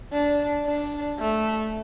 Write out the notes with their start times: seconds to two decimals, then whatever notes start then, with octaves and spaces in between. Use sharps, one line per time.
0.13 D4
0.66 D4
1.19 A3